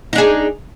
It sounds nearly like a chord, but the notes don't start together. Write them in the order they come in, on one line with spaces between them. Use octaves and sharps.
D#4 D4 G#4